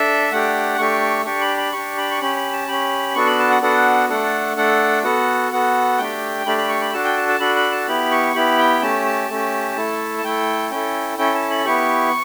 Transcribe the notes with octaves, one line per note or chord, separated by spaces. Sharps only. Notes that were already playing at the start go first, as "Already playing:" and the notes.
Already playing: D4 A4 E5
A3 D4 G4 F#5
A3 D4 G4 C#6
D4 G4 C#6
B5
B5
D4 G4 C#6
B5
C#6
C#4 G4 B5
B5
A5
C#4 G4 B5
B3 D4 F#4 A4 C#6
B5
A5
F#5
B3 D4 F#4 A4 F#5
A3 D4 A4 F#5
A3 D4 A4 F#5
B3 F#4 A4 F#5
B3 F#4 A4 F#5
A3 D4 G4 G5
A3 D4 G4 B5
B5
C#6
B5
D4 F#4 A4 A5
G5
A5
A5
D4 F#4 A4 B5
B5
A5
B3 E4 G4 B5
C#6
B3 E4 G4 B5
G5
A3 C#4 G4 A5
A5
A3 C#4 G4
A3 E4 A4
A5
A3 E4 A4 G5
C#4 E4 A4 G5
C#4 E4 A4 G5
A5
B5
B3 E4 G4 C#6